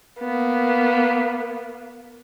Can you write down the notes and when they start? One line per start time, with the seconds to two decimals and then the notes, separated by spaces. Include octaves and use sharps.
0.20 A#3 B3